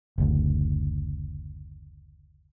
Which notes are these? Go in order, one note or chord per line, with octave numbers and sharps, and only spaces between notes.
F#1 D2